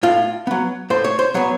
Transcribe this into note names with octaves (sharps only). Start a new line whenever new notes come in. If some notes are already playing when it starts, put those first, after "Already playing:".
A2 F4
F#3 B3
A2 C5
C#5
C5
F#3 B3 C#5